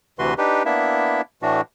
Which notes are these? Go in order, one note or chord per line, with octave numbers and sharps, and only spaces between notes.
D2 C3 E3 F#4 B4 C6
D4 D#4 G4 B4
A#3 B3 D4 E4 E5
A2 E3 A3 D4 F#4